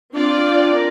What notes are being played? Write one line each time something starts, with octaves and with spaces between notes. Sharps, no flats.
C4 D4 F4 D5
A#4